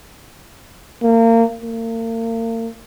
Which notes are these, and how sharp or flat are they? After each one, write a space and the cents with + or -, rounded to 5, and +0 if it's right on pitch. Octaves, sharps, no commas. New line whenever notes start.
A#3 -30
A#3 -40